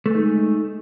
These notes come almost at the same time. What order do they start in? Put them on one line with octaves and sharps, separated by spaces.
A3 G#3 D#4